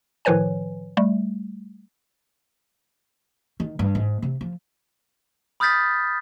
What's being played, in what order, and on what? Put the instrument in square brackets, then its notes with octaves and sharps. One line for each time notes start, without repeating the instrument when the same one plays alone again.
[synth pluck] A2 D#3 F3 B4 C#5 G#5
G3 A3
[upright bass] D#3
G2
G#2
C3
F3
[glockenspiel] B5 D#6 F6 G6 A6 B6